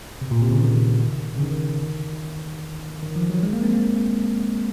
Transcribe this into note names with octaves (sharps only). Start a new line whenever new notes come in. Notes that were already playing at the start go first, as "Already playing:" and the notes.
C3
A#2
C3
C#3
D#3
C#3
D#3
D#3
F3
F#3
G#3
A#3
C4
A#3